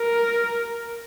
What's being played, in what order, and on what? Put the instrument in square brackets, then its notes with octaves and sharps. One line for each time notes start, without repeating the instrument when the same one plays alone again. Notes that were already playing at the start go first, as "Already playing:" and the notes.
Already playing: [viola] A#4